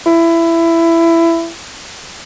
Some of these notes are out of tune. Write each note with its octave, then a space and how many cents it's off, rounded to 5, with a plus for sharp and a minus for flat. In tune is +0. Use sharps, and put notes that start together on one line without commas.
E4 +15